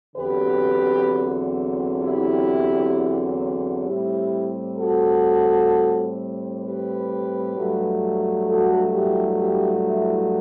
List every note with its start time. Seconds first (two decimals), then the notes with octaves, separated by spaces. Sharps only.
0.16 E2 D3 F#3 C4 G4 B4
2.01 E4 G4
3.85 A2 G3 C4 E4 G4
4.77 F#4 A4
6.62 G4 B4
7.54 G2 F#3 A3
8.46 F#4 A4
8.92 E4 G4
9.38 E4 G4
9.84 E4